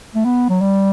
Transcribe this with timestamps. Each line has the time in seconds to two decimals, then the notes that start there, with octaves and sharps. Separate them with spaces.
0.15 A3
0.25 B3
0.49 F#3
0.61 G3